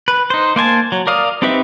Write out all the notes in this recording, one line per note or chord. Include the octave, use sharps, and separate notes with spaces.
B4
D#4 C5
A#3 C5 G#5 A5
F#3
A#4 D5 F5 D#6
C4 D#4 G4 B4 E5